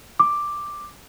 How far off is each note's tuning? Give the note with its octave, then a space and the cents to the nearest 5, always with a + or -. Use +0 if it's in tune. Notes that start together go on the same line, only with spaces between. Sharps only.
D6 +5